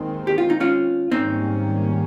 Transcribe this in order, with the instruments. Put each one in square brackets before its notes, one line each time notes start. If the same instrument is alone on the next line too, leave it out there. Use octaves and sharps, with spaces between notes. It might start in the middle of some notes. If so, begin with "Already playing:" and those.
Already playing: [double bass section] D#2 D#3 G#3 C4
[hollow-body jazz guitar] G4
F4
D#4
C#4 F4
[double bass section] G#2 D#3 G3 A#3 C#4 [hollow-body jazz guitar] C4 D#4